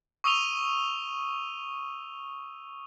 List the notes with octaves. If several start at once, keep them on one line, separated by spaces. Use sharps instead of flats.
C#6 D#6 E6 D#7 F7 G7